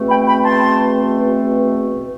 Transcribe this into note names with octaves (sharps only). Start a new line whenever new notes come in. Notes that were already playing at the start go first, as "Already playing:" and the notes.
Already playing: E2 B2 A3 C4
G5 B5
G5 B5
A5 C6